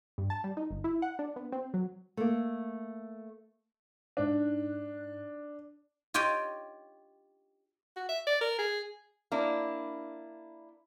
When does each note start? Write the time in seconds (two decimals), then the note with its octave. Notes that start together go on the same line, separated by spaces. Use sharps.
0.18 G2
0.30 A5
0.44 G3
0.57 D#4
0.71 G1
0.84 E4
1.02 F#5
1.19 D4
1.36 B3
1.52 C4
1.74 F#3
2.17 A3 A#3
4.17 G#2 D4 D#4 F#6
6.14 F4 G4 C#5 D#5 G5
7.96 F#4
8.09 E5
8.27 D5
8.41 A#4
8.59 G#4
9.32 A#3 D4 E4